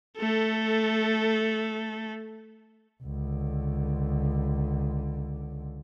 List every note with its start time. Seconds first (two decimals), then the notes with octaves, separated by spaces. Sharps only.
0.18 A3 A4
3.03 C#2 D3